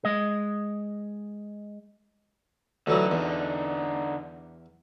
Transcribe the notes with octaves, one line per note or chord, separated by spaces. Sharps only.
G#3 D#5
D2 D3 E3 F#3 D#4
E2